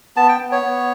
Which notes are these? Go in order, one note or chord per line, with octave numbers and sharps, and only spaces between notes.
B3 A5
G5
B3
C#5
B3